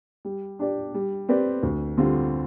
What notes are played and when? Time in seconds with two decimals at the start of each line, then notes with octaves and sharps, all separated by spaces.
0.25 G3
0.59 D4 G4 D5
0.94 G3
1.29 C4 G4 B4 D5
1.63 D2
1.98 D3 G3 C4 F4